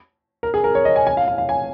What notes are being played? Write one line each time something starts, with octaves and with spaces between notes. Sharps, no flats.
A#4
G#4
A#4
C#5
D#5
G#5
G#5
F5
F5
F5
G#5